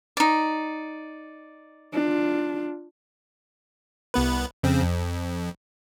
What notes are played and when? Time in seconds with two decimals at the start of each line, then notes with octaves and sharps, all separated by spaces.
0.17 D#4 D5
1.94 D4 F4
4.14 C2 B3 B4
4.63 F2 C#3 C4
4.82 F2